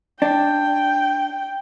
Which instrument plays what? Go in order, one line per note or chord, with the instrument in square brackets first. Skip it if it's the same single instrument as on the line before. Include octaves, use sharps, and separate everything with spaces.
[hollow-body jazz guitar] D4 [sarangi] G5